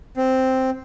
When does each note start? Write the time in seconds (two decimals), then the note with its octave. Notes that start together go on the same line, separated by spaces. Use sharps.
0.17 C4